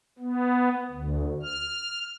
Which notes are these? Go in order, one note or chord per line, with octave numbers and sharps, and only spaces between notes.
B3
D2
F6